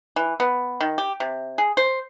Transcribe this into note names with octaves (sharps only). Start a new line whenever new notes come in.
E3
B3
D#3
G4
C3
G#4
C5